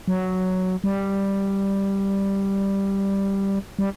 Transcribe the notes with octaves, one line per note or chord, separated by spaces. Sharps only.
F#3
G3
G3